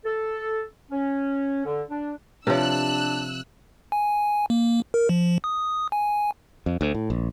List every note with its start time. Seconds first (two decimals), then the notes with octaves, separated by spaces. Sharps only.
0.05 A4
0.91 C#4
1.65 D3
1.90 D4
2.47 C3 F3 D4 B4 C#5 E6 F#6
3.92 G#5
4.50 A#3
4.94 A#4
5.09 F3
5.44 D#6
5.92 G#5
6.66 F2
6.81 D2
6.94 A2
7.10 A#1